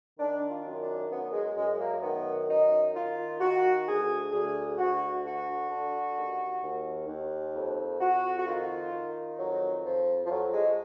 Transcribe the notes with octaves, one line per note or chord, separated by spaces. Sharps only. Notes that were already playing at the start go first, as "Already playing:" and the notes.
D#3 D4
F4
F#2
D4
F#2 B3
G#3
F#2 G#3
G#3
A#3
D#3 B3
F#2 D#4
D#3 F4
D#3 F#4
D2 G#4
D2 G#4
D2 F#4
D3 F#4
D3
D#2
D#2
D#2
F2
F2 F#4
F#4
D#3 F4
D#3
F2 F#3
F2 F3
F3
F2 F#3
G#3